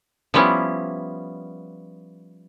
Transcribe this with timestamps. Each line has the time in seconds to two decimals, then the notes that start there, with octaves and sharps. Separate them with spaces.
0.34 F3 G3 B3 C#4 E4